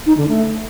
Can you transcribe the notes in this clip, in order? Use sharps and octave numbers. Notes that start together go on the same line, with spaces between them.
D#4
D3
A3